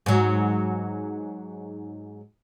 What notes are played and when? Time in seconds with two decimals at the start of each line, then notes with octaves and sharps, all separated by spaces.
0.06 G#2 F#3